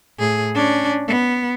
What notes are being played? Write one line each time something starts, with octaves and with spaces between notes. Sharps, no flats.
A2 G#4
C#4 D4
B3